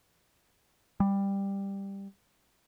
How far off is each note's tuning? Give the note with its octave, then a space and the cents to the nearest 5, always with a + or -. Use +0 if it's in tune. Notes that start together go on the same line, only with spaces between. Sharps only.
G3 +10